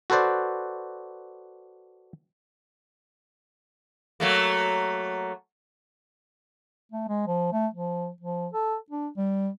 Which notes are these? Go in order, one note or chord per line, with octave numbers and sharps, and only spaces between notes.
F#4 A4 B4 C5 D5
F#3 A3 A#3
A3
G#3
F3
A3
F3
F3
A4
D4
G3